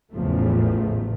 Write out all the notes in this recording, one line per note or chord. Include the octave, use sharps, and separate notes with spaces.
A1 E2 A2 C#3 F3 A3